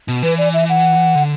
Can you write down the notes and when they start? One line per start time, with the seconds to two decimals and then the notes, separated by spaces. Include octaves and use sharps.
0.08 B2
0.22 E3 B4
0.38 D5
0.54 E5
0.69 F#5
1.15 D3